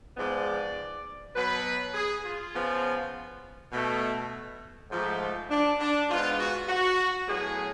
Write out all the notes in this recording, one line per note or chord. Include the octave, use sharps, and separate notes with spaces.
G#2 F3 G#3 B3 D5
B2 F#3 B3 B4
G#4
F4
C#3 F3 B3
B2 A3
G#2 F3 A3
D4
D4
G#2 G#3 B3 F4
F#4
F#4
A2 F#3 B3 G#4